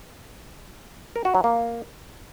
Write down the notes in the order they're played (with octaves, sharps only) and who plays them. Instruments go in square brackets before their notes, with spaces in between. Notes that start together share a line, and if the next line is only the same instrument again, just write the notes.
[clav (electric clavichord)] A#4
F#4
F#3
A#3